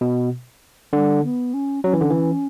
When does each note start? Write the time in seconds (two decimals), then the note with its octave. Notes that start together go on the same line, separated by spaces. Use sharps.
0.01 B2
0.92 D3 G3
1.23 B3
1.54 C#4
1.84 F#3 C#4
1.93 E3
2.01 D3
2.10 E3